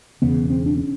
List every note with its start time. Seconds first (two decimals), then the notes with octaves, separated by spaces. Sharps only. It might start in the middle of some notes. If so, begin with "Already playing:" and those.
0.22 E1 E2 C#3 B3
0.50 C4
0.66 D4
0.78 C#4